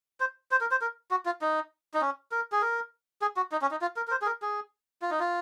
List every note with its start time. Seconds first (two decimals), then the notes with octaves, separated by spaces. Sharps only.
0.20 C5
0.51 C5
0.61 A#4
0.71 C5
0.81 A#4
1.11 F#4
1.26 F4
1.42 D#4
1.94 D#4
2.01 C#4
2.32 A#4
2.52 G#4
2.62 A#4
3.22 G#4
3.37 F#4
3.52 D#4
3.62 C#4
3.71 D#4
3.82 F4
3.96 A#4
4.07 A#4
4.11 C5
4.22 G#4
4.26 A#4
4.42 G#4
5.02 F4
5.11 D#4
5.20 F4